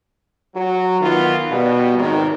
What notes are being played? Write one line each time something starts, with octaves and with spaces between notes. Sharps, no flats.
F#3
D#3 E3 B3 F4
B2 G3
G#1 C3 D#3